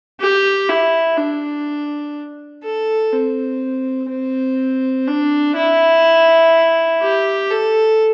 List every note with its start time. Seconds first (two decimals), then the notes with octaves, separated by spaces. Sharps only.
0.20 G4
0.69 E4
1.17 D4
2.64 A4
3.13 C4
4.10 C4
5.07 D4
5.56 E4
7.03 G4
7.51 A4